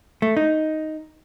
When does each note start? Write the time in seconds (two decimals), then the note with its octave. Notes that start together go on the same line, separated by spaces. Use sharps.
0.22 A3
0.37 D#4